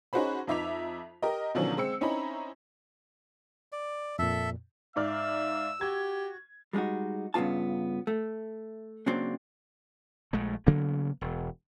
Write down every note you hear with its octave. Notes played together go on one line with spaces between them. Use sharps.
C#4 D#4 F#4 G#4 C5 B5
F2 D#4 E5 D6 B6 F7
G4 A#4 D#5
B2 D3 D#3 F3 F#3 C#4
G#3 C4 E6 C#7
C4 C#4 D#4 E4 A#5 B5
D5
F2 A#2 A4 E5
G#2 D5 E5 F5 E6 F6
F#4 G4 G#6
G3 G#3 C#4 D#4 F#4
G2 C#3 B3 F4 A5
A3
C#3 F#3 A#3 C4 D4
A#1 G#3 A3
C#3 F#3 A#3 B3
E1